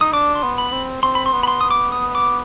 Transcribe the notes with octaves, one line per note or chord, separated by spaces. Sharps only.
D#4 D#6
D4 D6
C6
B3
B5
C4
C4 C6
B5
C6
B3
B5
C6
B3 D#6
D6
D#6
D6